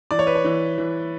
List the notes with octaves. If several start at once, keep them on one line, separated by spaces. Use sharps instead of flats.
E3 D5
C#5
B4
C#5
E3
E3